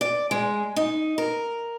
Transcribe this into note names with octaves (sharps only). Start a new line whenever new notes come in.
D5
G#3
D#4
A#4